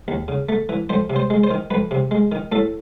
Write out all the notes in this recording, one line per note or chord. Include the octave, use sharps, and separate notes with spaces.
D#2
C#3
A3
E3
F2 C5
C3
C5
G#3
C5
D#3
F2 B4
C3
G#3
D#3
A2 A4